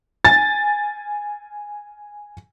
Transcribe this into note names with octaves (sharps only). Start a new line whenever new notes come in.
G#5 A6